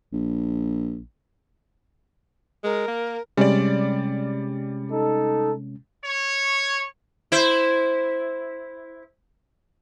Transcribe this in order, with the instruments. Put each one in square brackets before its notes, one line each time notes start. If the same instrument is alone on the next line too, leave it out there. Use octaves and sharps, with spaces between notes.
[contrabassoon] A#1
[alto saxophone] G#3 [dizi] A#4
[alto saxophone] A#3
[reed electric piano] C3 G#3 C#4 [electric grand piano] G3 D5
[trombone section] D#4 A4
[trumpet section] C#5
[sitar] E4 C5